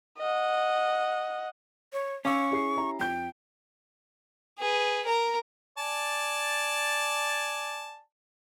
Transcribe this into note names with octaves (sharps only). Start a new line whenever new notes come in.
D#5 F#5
C#5
C#4 F5 C#6 D6 E6
E4 G#4 C7
E4 G4 A#5
F2 G5 G6
G#4 B4
A#4 A#5
D5 G#5 A5